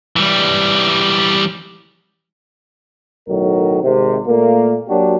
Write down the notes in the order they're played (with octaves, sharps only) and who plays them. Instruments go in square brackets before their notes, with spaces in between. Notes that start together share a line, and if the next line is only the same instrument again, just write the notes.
[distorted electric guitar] E3 G3
[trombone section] B1 A2 D#3 F#3 A#4
G#1 C3
A#2 A3 A#3
F#3 A#3 D4 F#4 G4